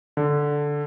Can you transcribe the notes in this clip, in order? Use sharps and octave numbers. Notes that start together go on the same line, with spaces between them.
D3